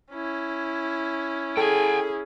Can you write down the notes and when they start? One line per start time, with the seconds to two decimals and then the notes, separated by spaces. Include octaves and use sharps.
0.13 C#4 E4
1.57 G#4 A4 G5 G#5